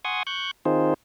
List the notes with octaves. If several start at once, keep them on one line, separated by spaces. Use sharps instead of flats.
F#5 G#5 C6 C#6 D#6
C#6 F#6 G6
D#3 C4 D#4 F4 G#4 C5